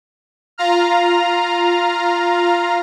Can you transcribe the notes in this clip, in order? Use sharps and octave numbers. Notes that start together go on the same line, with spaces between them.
F4 F5 A#5 F6